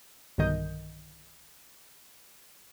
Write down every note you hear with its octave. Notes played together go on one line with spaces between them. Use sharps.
B1 G2 D3 D#3 D#5 G6